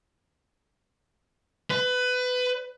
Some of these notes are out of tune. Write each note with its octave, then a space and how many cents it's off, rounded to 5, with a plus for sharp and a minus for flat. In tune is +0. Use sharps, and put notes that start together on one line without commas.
B4 +20